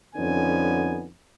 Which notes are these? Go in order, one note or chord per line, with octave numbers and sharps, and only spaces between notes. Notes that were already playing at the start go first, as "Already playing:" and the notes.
F2 D3 B3 C#4 D#4 G#5